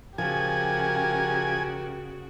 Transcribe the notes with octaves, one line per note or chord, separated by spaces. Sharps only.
C#3 F3 F#4 G4 A#4 G#5